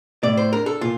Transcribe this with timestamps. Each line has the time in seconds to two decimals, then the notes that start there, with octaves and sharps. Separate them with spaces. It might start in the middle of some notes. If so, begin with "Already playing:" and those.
0.23 A2 D5
0.37 C5
0.52 D4 A#4
0.66 A4
0.81 A#2 F4